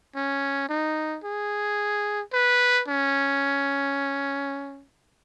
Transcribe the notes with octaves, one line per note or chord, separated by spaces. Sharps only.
C#4
D#4
G#4
B4
C#4